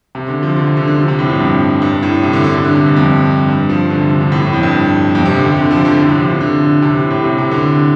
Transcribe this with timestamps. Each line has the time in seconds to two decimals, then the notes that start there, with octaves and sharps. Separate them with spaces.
0.15 C3
0.28 D3
0.43 F3
0.56 D3
0.67 C3
0.77 D3
0.88 D3
0.98 F3
1.08 C3
1.19 A2
1.29 G2
1.40 F2
1.82 G2
2.03 A2
2.23 C3
2.33 D3
2.44 D3
2.55 D3
2.65 D3
2.75 C3
2.86 G2
2.96 F2
3.48 G2
3.69 F3
3.90 D3
4.01 C3
4.11 D3
4.21 C3
4.32 A2
4.42 A2
4.53 F2
4.63 G2
5.15 F2
5.25 C3
5.36 D3
5.46 C3
5.57 D3
5.71 F3
5.85 D3
5.98 A2
6.09 C3
6.19 F3
6.30 D3
6.41 D3
6.82 C3
6.96 A2
7.10 A2
7.24 C3
7.38 C3
7.51 D3